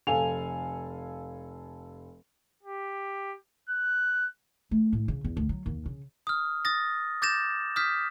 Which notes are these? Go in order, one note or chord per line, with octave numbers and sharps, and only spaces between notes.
F1 A4 F5 G#5 F7
G4
F#6
A3
A2
C#3
E2
D2
F#3
D#2
C#3
D#6 F6
D#6 A6 A#6
D6 G6 A6 A#6 E7
D#6 F6 G6 B6